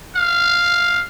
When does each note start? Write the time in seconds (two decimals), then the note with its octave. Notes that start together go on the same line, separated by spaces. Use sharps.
0.16 F5